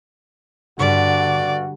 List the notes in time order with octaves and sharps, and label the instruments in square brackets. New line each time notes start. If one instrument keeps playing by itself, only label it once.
[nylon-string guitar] G2 [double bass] D3 [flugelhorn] F#4 [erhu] D5